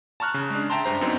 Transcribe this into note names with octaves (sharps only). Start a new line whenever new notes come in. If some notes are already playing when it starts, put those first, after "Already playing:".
A5 A#5 C#6 F6 F#6
C#3
G#3 D4
E5 G5 A5 A#5 C6
G2 C5 A#5
F#2 B3 C4 D4 D#4